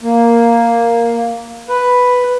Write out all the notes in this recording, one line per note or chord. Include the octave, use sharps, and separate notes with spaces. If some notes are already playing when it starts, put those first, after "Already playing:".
A#3
B4